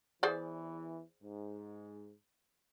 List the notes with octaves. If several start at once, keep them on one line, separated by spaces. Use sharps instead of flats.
E2 E3 G#4 C5 D5
G#2